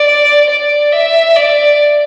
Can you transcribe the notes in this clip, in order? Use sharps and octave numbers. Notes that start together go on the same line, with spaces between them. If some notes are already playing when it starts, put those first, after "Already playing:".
Already playing: D5
D5
E5
D5